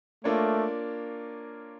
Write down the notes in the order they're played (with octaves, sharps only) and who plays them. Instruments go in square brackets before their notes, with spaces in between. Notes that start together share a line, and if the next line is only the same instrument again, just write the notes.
[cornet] A3 [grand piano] A#3 D4 F4 A#4 C#5